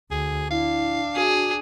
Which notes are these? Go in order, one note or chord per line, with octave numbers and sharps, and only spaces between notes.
D2 G#4
D4 E4 F5
F#4 G#4